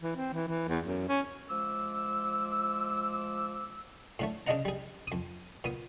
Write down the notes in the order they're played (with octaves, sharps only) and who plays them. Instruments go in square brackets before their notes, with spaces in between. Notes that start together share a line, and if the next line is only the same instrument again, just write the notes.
[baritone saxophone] E3
C4
E3
E3
E2
F#2
C#4
[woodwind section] F3 G#3 D6 E6
[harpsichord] A2 D3 A3
C#3 D4 D#4 D#5 F#5 A#5
G3 G#4
F2 D#6
A#2 B3 D#6